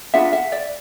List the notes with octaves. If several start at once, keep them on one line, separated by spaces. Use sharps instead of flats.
D4 F4 G#4 B4 E5 F#5
E5 F#5
D5 E5